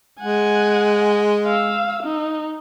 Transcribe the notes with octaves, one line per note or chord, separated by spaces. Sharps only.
G#3 F#5 G#5
F5 E6
D#4